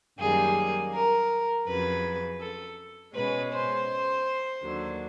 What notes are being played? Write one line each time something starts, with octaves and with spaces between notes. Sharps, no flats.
F#2 D#3 G3 A#3 G#4
A#4
F2 C#3 F#3 B4
A4
B2 G#3 C#4 B4
C5
D#2 D3 F#3